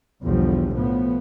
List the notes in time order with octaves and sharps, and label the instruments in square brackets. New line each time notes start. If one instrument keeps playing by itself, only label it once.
[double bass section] B1 E2 D3 F3 G3
A2 F3 B3